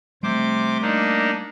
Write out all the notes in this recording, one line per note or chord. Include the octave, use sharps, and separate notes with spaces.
C3 G3 A3 C5 D6
A#3 D4 D#4